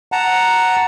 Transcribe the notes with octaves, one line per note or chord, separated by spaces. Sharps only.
F#5 A5 A#5